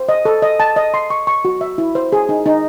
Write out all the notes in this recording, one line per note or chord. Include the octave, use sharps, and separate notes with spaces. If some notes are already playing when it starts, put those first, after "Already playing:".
Already playing: C5
D#5
A4
D#5
A5
D#5
C6
C#6
C#6
F#4
E5
E4
C5
G#4
D#4
D#4